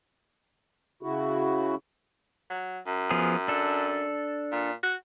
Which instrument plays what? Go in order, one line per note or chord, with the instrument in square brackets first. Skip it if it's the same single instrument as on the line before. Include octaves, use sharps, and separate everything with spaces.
[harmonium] C#3 E4 F#4
[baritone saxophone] F#3
F#2
[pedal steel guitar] F3 B3 G#4
D4 A4
[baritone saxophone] A#2
F#4